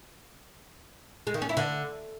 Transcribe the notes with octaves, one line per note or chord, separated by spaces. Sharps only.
G#3
D#3
C#4
E4
D3